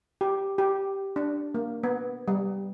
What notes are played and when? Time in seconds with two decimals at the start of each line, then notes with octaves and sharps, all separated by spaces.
0.21 G4
0.58 G4
1.16 D4
1.54 A#3
1.84 B3
2.28 G3